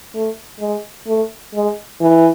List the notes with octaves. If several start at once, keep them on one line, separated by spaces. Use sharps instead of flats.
A3
G#3
A3
G#3
E3